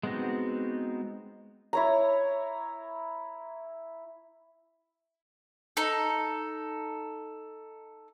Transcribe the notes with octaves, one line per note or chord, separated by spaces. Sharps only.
G#3 B3 C4 D#4 F#4
E4 C#5 A#5
D#4 A4